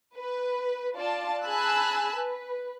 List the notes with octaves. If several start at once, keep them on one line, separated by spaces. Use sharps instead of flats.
B4
F4 D5 A5
G#4 G#5 A5 B5 E6 F#6
B4